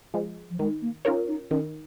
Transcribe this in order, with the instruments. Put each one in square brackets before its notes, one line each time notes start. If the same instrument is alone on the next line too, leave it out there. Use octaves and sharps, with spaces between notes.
[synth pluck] F3 G#3
[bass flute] F3
[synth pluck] D#3 [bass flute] G#3
[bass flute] A#3
[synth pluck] C#4 F4 A#4 C#5 [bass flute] D#4
[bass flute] D#4
[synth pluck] D#3 [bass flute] C#4